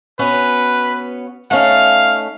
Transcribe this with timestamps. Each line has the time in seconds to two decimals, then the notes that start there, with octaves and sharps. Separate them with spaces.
0.19 B3 C#4 F#4 B4
1.51 A3 C#4 D#4 F5